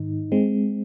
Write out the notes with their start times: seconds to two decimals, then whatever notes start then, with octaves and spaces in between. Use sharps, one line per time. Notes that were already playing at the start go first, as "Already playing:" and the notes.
Already playing: G#2 D#3 D#4
0.32 G#3 C4